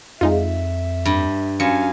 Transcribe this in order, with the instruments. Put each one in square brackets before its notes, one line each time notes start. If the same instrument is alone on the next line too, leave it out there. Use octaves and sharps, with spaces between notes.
[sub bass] F2 [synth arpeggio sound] G#3 D#4 F4 [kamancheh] E5
[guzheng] G2
[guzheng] F#2 [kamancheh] F5 G#5 [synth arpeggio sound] C#7